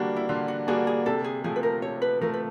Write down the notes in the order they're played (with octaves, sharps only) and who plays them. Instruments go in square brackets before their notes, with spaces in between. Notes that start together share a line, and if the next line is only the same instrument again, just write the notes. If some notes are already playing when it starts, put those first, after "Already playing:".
Already playing: [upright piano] D3 G3 A#3 D4 F#4
[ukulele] E4
[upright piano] D3 [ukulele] F4
[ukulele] F#4
[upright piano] G3 A#3 D4 F#4 [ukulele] G#4
[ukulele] G#4
[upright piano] C3 [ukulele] A4
[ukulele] G#4
[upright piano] F3 A3 [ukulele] G#4
[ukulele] B4
A#4
[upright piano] C3 [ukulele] C#5
[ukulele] B4
[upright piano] F3 A3 [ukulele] A#4
[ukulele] B4